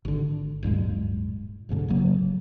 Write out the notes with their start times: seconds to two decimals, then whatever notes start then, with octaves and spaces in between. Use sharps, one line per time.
0.05 G#1 D3
0.63 D1 G2 A#2 G#3
1.69 F#1 C2 G#2 D3
1.88 F1 C#3 F#3 A#3